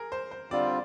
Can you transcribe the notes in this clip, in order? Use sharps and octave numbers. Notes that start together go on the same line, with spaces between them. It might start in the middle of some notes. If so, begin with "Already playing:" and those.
Already playing: G#4 A#4
C5
C5
D3 G3 C4 F4 D5